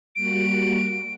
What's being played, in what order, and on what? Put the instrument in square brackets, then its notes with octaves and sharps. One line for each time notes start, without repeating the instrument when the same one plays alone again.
[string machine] G3 A#3 F#4 [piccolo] D7